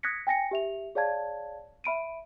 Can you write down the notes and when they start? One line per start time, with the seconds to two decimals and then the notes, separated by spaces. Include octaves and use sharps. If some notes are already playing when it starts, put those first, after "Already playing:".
0.03 D#6 F#6 G#6 A#6 B6 C#7
0.27 G5 G#5 A#6 C#7
0.51 G4 E5 F7
0.95 G#4 C#5 D5 F5 A5 G#6
1.84 E5 B5 D7 D#7